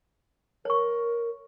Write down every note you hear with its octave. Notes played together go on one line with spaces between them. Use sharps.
A#4 C#5 C#6